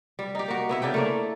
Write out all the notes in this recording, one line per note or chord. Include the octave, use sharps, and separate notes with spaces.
G3
D#4 G4
A#3 F#4
B3 E4 E5
C#3 D4 E4 G5
A3 A#3 D5